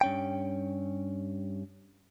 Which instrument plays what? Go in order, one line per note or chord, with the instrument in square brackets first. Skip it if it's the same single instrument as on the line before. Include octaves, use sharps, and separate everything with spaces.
[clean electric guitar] G2 C#4 G5